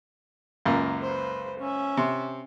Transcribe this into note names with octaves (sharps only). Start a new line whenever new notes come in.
C#2 F#2 A#3
B4 C5
C#4 E5
C3